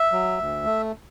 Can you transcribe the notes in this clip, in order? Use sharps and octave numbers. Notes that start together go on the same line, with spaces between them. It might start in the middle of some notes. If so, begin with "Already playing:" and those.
Already playing: E5
F#3
D2
A3